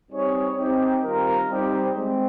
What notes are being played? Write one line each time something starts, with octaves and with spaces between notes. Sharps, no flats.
G3 C4 D#4 G#4 C#5
C4 D#4 G4
D#3 G3 C4 F4 A#4
G3 C4 D#4 G4
G#3 C4